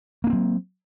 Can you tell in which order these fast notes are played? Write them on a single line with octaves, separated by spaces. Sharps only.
A#3 D4 C4 F#3